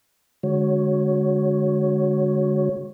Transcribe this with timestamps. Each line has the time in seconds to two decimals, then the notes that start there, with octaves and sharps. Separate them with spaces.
0.43 D3 G#3 F#4 C#5